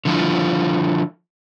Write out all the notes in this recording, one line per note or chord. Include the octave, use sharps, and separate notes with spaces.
D3 F3 E4 F4